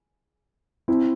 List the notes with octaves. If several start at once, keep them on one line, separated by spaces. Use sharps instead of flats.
C4 E4